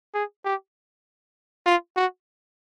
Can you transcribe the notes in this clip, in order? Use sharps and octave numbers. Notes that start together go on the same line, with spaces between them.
G#4
G4
F4
F#4